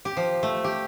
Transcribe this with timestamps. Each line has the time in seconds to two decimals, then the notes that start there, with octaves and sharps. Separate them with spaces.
0.05 G4
0.17 F3
0.43 A3
0.64 G4